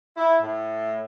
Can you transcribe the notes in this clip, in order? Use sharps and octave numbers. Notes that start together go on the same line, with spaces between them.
E4
A2